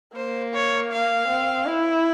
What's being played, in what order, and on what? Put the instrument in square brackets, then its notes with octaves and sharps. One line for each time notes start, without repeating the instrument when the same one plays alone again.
[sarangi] A#3 [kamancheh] C5
[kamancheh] C#5
F5
[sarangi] C4
E4